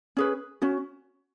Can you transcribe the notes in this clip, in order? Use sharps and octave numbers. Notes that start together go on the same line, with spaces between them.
C#4 G#4 B4
C#4 F#4